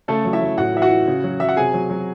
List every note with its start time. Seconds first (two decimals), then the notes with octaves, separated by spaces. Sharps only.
0.08 C#3 A3 A4
0.25 F#3
0.33 E4 E5
0.41 F#3
0.57 A2 F#4 F#5
0.74 E3 E5
0.82 F#4 F#5
0.90 E3
1.07 C#3
1.24 F#3
1.40 F#3 E5
1.49 F#5
1.56 C3 G#4 G#5
1.74 F#3
1.90 F#3